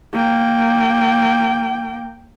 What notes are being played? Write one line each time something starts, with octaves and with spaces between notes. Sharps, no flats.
A#3 G5